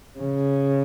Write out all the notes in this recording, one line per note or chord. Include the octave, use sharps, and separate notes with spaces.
C#3